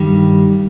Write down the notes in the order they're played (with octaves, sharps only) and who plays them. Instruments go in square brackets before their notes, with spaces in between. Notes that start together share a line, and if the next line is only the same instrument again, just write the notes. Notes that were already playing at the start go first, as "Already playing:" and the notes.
Already playing: [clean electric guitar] G2 D#3 G3